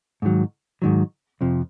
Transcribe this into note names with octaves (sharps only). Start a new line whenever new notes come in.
G#2 D#3 F#3
G#2 D#3 F#3
F2 C3 F3